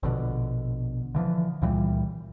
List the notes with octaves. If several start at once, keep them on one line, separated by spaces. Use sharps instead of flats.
A#1 B2 D3
D3 E3 F3
C#2 A#2 E3 G3